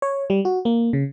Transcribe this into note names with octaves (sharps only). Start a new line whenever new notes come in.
C#5
G3
F#4
A#3
C#3